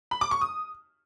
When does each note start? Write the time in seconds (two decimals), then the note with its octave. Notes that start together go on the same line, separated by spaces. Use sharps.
0.11 B5
0.21 D6
0.31 C#6
0.41 D#6